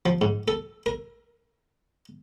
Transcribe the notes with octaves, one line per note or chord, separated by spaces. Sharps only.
F3
G#2
A4
A#4